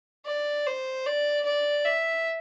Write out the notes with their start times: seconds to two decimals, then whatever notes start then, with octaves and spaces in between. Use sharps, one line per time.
0.26 D5
0.66 C5
1.06 D5
1.45 D5
1.85 E5